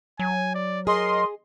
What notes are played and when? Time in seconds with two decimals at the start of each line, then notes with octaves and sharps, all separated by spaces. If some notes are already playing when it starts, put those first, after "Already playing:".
0.19 F#3 G#5
0.54 D5
0.87 G#4 A#4 D#5 C6